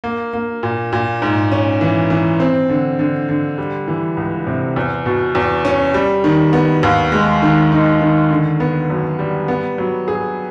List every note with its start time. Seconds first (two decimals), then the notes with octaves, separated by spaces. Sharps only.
0.04 A#3
0.33 A#3
0.63 A#2
0.93 A#2
1.22 G#2
1.52 C#4
1.81 E3
2.10 E3
2.40 C4
2.69 D3
2.99 D3
3.29 D3
3.58 G3
3.88 E3
4.17 C#2
4.47 C3
4.76 E2
5.06 B2
5.35 E2
5.65 C#4
5.94 G3
6.24 D#3
6.53 B3
6.83 D#2
7.12 G#3
7.42 D#3
7.72 D#4
8.01 D#3
8.30 D3
8.60 B3
8.90 F#2
9.19 G3
9.48 B3
9.78 F#3
10.08 G#4